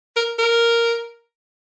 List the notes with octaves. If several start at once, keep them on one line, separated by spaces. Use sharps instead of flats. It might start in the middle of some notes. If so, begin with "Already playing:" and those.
A#4
A#4